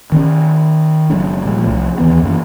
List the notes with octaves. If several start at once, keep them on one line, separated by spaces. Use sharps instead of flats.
D#3 C4 C#4
F#1 F#3 G#3 D4
A#2 F3 G3
C2 F3 A3
D#2 E3 B3
F#2 E3 A#3